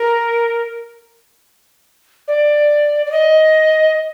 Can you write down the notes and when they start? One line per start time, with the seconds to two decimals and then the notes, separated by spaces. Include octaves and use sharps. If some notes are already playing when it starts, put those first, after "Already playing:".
Already playing: A#4
2.27 D5
3.06 D5
3.11 D#5